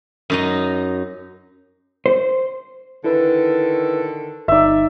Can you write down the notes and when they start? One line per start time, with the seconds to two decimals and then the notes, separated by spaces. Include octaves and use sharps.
0.30 F#2 D#4 D#5
2.06 C5
3.04 D3 D#3 E4 A4 B4
4.48 G1 D#4 D5 E5